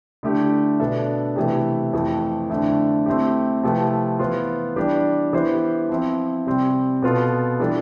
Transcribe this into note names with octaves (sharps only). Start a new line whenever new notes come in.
D3 A3 E4 G4
B2 B3 D4 A4 E5
C3 E3 A3 E4 B4
F2 E3 A3
F2 D3 A3 E4
A3 C4 E4 G4
C3 F3 A3 E4 B4
E3 B3 F4 C5
E3 G3 D4 G4
E3 B3 E4 G4 C5
F3 C4 E4
C3 G3 C4
B2 B3 F4 A4
E3 G3 D4 F4 A4